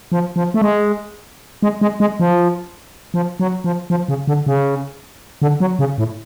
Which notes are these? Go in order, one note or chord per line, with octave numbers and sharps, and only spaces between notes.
F3
F3
A3
G#3
G#3
G#3
G#3
F3
F3
F#3
F3
F3
C#3
D3
C#3
D3
F#3
C#3
A2